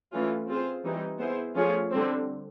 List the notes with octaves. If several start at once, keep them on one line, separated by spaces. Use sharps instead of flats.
E3 A3 C#4 F4
C4 F4 G#4 C5
E3 G3 C4 D#4
B3 E4 G#4 C5
F3 A3 C#4 F4 G#4
D3 G3 C4